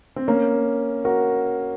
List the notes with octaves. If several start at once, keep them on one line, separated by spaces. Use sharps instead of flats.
C4
A#3 C#4
F#4 A#4